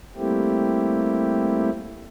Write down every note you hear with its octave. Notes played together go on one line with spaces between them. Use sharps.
G3 A3 A#3 C4 E4 G4